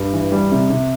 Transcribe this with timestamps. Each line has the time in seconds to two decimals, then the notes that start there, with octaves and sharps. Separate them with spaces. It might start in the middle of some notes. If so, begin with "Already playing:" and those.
Already playing: G2
0.13 E3
0.32 G3
0.51 C3
0.70 C3